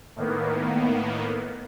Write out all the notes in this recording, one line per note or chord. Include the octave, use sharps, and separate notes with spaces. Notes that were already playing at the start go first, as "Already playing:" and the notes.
A2 D#3 A#3 B3